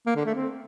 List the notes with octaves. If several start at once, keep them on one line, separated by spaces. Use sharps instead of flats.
A#3
D3
A3
C4